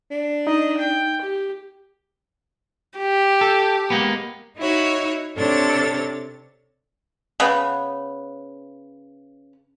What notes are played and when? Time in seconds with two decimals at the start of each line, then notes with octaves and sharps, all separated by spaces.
0.11 D4
0.47 D#4 D#5
0.78 G5
1.21 G4
2.98 G4
3.41 A4
3.90 G#3 A#3 B3
4.57 D#4 E4 F#4 C#5
5.37 C3 D4 A4 C#5 A6
7.40 C#3 B3